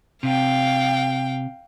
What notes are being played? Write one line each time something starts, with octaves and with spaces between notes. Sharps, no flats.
C3 F5 G5